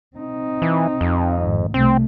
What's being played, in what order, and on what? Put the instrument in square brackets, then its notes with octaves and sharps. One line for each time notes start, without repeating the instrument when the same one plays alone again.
[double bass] C4 D#4
[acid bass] E3
F2
[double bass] G#1
[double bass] C2 A3 [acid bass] C4